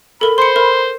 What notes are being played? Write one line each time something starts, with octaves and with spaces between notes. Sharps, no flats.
A4 A#4 B5
C5 C6 C#7
A#4